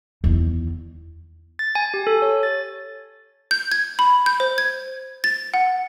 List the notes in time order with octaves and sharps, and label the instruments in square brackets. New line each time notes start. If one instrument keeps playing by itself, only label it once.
[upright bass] E2 D#3
[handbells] A6
G#5
G4
A4
C#5
A6
[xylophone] G6
G#6
B5
G6
C5
G#6
A6
F#5